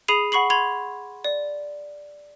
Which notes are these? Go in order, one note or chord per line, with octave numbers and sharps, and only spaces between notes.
G#4 B5 D#6 C7 D#7 F7
F#5 B5 C#6 C7 F#7
B5 C6 G#6 F7
D5